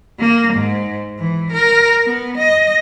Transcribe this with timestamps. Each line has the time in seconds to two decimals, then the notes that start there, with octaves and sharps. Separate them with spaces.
0.19 A#3
0.54 G#2
1.19 E3
1.52 A#4
2.06 B3
2.38 D#5